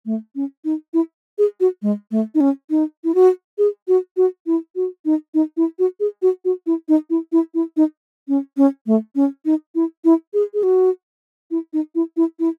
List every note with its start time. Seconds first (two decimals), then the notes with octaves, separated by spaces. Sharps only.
0.06 A3
0.36 C#4
0.65 D#4
0.94 E4
1.38 G#4
1.60 F#4
1.82 G#3
2.11 A3
2.35 D#4
2.40 C#4
2.70 D#4
3.04 E4
3.15 F#4
3.58 G#4
3.88 F#4
4.17 F#4
4.46 E4
4.76 F#4
5.05 D#4
5.34 D#4
5.57 E4
5.79 F#4
6.00 G#4
6.22 F#4
6.45 F#4
6.67 E4
6.89 D#4
7.10 E4
7.32 E4
7.54 E4
7.77 D#4
8.28 C#4
8.57 C#4
8.87 A3
9.16 C#4
9.45 D#4
9.75 E4
10.05 E4
10.34 G#4
10.54 G#4
10.63 F#4
11.51 E4
11.73 D#4
11.95 E4
12.17 E4
12.39 E4